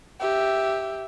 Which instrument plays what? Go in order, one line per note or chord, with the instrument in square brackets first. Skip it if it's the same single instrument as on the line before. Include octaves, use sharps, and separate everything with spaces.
[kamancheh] G4 E5